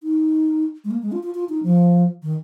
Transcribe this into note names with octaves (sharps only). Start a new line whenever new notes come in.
D#4
G#3
A#3
G#3
F4
F4
F4
D#4
F3
D#3